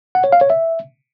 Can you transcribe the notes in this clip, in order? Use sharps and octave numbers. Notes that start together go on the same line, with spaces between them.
F#5
C#5
F5
C#5
E5